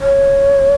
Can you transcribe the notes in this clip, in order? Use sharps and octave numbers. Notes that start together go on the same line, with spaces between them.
C#5